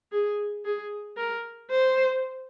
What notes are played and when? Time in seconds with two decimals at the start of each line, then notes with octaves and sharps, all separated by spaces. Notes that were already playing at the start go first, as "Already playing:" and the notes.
0.12 G#4
0.65 G#4
1.17 A#4
1.70 C5